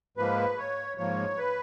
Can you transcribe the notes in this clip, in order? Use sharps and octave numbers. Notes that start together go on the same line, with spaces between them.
G#2 F3 A#3 B4
C#5
G#2 F3 A#3 C#5
B4